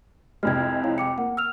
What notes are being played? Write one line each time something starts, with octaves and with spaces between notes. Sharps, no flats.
C2 F2 G#3 F6 G#6
E4 C#5 F5
G5 D6 C#7
A#3 F#5
E6 F6 F7